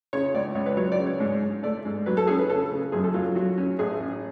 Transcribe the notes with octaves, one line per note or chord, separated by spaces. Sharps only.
C#3 C#5
C#2 D5
C#2 C#5
B4
F#3 C#5
D5
C#3
C#5
G#2
G#2
A3 D5
G#2
F#3 B4
A4
C#4 G#4
B4
C#3 A4
C#3
F#2 G#4
A4
F#3 F4
F#3 F#4
C#4
A1 G#4
C#4